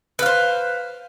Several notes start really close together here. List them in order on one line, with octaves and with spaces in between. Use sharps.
B4 F5 C5